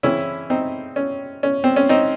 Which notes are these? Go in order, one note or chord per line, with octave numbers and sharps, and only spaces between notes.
C#3 E3 C4 C#4 E4
C4 D#4
C#4
C#4
C4
C#4
C4 D#4